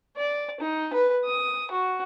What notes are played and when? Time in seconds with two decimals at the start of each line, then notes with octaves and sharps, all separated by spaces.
0.17 D5
0.60 D#4
0.93 B4
1.25 D#6
1.71 F#4